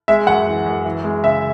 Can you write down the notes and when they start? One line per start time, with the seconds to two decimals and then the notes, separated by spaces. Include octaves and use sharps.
0.08 G#3 E5
0.27 F#2 F#5
0.47 E3
0.66 F#2
0.85 E3
1.04 G#3
1.23 C#3 E5